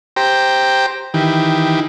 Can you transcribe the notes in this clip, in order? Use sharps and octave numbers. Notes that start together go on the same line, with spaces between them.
G4 C5 G5 A#5
D#3 E3 G4